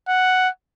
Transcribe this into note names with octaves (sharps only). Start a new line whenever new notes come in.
F#5